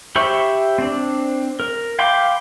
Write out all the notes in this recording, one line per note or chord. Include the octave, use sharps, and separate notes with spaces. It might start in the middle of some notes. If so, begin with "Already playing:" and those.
G4 C5 E5 B5 C#6
C4 D4
A#4
F5 G5 B5 C6 D6